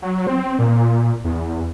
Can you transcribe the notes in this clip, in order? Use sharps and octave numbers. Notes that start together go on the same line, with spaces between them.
F#3
C4
A#2
E2